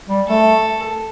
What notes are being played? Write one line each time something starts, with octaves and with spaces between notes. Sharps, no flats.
G3
A3 A4